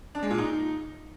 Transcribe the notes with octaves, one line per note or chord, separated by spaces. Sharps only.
D4
G#3
A#2
D#4